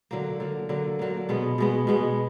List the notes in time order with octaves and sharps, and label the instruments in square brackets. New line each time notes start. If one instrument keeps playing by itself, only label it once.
[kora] D3 F#3 A#3
D3 F#3 A#3
D3 F#3 A#3
D3 F#3 A#3
B2 G#3 B3
B2 G#3 B3
B2 G#3 B3